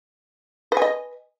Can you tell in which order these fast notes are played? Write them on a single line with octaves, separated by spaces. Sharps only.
B4 G#5 D#5